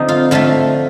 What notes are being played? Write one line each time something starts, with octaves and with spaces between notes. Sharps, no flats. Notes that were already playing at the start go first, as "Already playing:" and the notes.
Already playing: D3 F3 C4 D#4
F4
D3 F3 A3 F4